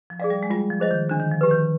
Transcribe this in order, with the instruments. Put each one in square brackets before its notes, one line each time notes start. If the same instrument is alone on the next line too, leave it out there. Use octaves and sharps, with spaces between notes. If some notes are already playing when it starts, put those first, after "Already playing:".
[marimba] F3
[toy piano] G#4 D5 F5
[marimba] G3
G#3
[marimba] G3 [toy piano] F4
[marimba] F3
[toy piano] G#4 C5 D#5
[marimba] D#3
[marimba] D3 [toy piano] D4
[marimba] D#3
F3
[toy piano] G4 B4
[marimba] D#3